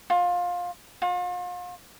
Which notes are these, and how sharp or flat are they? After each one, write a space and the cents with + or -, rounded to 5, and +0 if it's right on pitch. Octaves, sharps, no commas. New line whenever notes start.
F4 +20
F4 +40